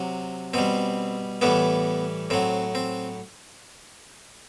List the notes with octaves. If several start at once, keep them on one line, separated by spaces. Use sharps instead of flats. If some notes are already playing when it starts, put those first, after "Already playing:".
Already playing: C3 F#3
B2 G3 C4
A2 E3 G3 B3
A2 F#3 C4
C4